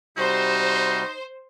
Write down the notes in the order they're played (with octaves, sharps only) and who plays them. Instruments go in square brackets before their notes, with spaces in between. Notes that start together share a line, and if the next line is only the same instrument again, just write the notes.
[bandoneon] C3 G3 F#4 [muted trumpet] D#4 [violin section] C5